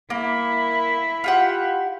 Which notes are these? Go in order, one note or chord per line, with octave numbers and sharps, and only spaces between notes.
A#3 E4
F4 G4 F#5